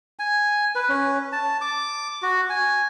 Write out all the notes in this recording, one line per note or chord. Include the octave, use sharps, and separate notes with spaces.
G#5
B4
C#4
A5
D6
F#4
G#5